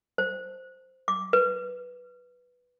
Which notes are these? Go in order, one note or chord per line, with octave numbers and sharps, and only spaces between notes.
C5
D6
B4